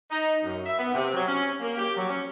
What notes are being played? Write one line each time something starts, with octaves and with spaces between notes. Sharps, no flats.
D#4
F#2
E5
B3
C3
F#3
C#4
A#3
G4
F#3
C#4